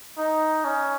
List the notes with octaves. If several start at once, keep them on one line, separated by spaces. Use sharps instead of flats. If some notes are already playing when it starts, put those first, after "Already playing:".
D#4
C#4